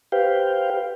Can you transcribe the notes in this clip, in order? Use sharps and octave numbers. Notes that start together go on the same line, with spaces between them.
G4 B4 C5 F5 G5